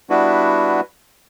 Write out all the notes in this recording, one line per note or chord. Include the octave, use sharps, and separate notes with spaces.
G3 B3 D4 E4 F#4 B4